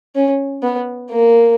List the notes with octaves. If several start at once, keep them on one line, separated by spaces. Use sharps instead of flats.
C#4
B3
A#3